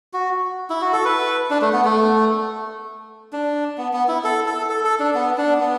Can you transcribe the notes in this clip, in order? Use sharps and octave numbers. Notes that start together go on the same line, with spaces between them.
F#4
E4
F#4
A4
B4
D4
A3
B3
A3
D4
B3
B3
E4
A4
A4
A4
A4
D4
B3
D4
B3